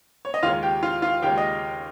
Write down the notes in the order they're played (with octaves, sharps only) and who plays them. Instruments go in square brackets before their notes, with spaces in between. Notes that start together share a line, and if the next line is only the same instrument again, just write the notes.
[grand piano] C#5
D#5
D#2 C#3 G#3 C#4 F4 F5
G4 G5
F4 F5
F4 F5
D#2 C#3 G#3 C#4 G4 G5
D#5